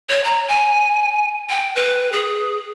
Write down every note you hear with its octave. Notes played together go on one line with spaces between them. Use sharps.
C#5
A#5
G#5
G5
B4
G#4